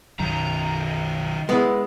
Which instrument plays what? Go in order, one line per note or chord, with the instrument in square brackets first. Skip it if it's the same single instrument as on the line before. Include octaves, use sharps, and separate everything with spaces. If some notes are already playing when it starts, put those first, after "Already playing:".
[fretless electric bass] B1 F#2 [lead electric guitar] D#3 F#3 [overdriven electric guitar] A#5
[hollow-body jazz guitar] G#3 B3 E4